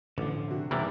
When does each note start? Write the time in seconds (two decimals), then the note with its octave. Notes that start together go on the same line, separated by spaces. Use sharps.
0.18 A1 D3 F3 D6
0.47 C3 D4 F#4
0.71 E2 G2 C3 E3 D#4 A#4 A6